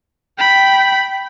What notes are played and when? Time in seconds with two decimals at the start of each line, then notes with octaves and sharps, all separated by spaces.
0.38 G5 B5